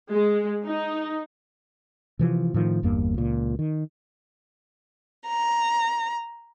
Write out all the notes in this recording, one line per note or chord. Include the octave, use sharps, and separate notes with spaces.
G#3
D#4
C3 E3 F3
A2 D#3 F3
G1 E2 G2 A#3
C#2 A#2
D#3
A#5